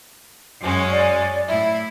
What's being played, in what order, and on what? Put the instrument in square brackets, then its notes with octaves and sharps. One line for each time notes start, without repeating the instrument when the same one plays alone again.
[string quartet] F#2 G#3 C#4
[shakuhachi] D5
[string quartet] A2 E4 [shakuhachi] E5